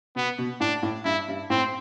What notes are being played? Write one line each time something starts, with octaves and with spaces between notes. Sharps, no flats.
B2 B3
B2
A2 D4
A2
G2 E4
G2
A2 C4